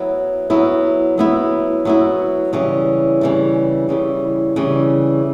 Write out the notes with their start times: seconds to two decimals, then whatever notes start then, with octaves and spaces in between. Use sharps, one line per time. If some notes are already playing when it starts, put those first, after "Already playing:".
Already playing: F#3 B3 E4
0.50 F#3 B3 E4
1.18 F#3 B3 E4
1.85 F#3 B3 E4
2.53 C#3 E3 G3
3.21 C#3 E3 G3
3.89 C#3 E3 G3
4.56 C#3 E3 G3